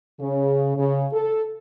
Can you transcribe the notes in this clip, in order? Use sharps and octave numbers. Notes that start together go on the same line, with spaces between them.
C#3
C#3
A4